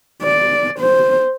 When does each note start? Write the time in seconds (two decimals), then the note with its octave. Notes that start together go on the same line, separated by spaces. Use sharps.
0.23 D5
0.79 C5